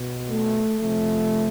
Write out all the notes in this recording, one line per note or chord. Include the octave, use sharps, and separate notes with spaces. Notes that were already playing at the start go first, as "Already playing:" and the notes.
Already playing: B2
A3
C3 F3 A3